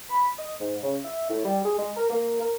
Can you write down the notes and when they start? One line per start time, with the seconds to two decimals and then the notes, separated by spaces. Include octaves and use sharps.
0.08 B5
0.38 D#5
0.60 G#2
0.83 C#3
1.04 E5
1.29 A2
1.45 G3
1.64 G#4
1.78 G#3
1.96 A#4
2.10 A#3
2.40 A#4